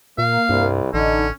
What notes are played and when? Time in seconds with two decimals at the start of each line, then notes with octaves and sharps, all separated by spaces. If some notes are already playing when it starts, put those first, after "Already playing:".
0.18 A#2 A#3 F5
0.49 C2 G2
0.94 A1 D3 C#4 D#4